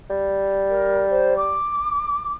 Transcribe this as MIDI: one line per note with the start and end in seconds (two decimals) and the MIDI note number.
0.10 1.57 55
0.69 1.05 70
1.10 1.34 72
1.37 2.36 86